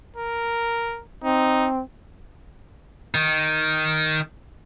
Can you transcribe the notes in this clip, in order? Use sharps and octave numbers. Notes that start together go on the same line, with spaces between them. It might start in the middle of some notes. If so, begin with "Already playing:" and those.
A#4
C4 D#4
D#3